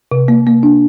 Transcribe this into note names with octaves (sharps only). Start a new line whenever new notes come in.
C3
A#3
A#3
D4